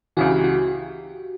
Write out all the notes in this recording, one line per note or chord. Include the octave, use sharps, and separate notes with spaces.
C#2 C#3 E3 F#4
G4
F#4